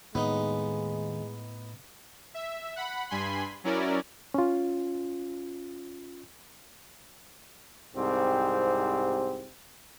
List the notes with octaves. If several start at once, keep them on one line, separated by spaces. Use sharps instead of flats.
D#2 A2 G#3 B3 D#4
E5
F#5 B5
G2 G#5 B5 C6
F#3 C#4 E4 A#4 D5
C#4 F4
C2 G#2 C4 G4